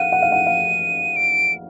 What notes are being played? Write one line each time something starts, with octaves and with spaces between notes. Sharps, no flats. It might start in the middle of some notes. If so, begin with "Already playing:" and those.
Already playing: F5 F#5 D#7
F#5
F5
F#5
F5
D7